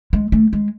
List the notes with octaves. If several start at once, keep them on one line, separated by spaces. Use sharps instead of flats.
G#3
A3
G#3